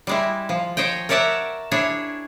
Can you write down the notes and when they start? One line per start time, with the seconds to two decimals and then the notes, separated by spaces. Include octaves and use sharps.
0.07 G3 G#3 E4
0.49 F3
0.77 C5 C#5 D#5 G5
1.09 A#4 C#5 D5 E5 F#5 A5
1.71 D4 E4 G#4 C#5